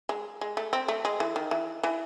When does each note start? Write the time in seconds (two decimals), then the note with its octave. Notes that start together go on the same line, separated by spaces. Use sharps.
0.09 G#3
0.41 G#3
0.57 A3
0.73 C4
0.88 A3
1.05 G#3
1.20 E3
1.36 D#3
1.51 E3
1.83 E3